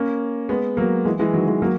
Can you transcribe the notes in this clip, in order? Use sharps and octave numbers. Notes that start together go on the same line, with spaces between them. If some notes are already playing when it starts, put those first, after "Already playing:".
Already playing: A#3 C#4
G#3 B3
F#3 A#3
E3 G#3
E3 G#3
D#3 F#3
E3 G#3
F#3 A#3